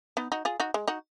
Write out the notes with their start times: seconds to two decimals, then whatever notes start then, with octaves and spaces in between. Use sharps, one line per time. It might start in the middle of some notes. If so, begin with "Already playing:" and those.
0.17 B3 D#4
0.32 D#4 F#4
0.45 F4 G#4
0.60 D#4 F#4
0.74 G#3
0.88 D#4 F#4